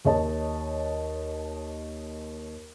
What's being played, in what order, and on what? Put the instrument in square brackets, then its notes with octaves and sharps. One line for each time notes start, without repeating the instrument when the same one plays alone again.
[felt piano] D#2 C#5 D#5 A5